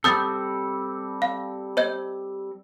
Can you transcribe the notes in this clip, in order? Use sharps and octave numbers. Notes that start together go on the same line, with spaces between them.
G3 C4 A4 D#6 G6 A6
F5
C5 D#5 G6